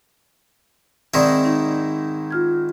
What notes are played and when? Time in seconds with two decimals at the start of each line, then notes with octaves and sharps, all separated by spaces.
1.14 G#2 D#3 C4 E4 D5
1.45 D#4
2.31 F4 F6 G#6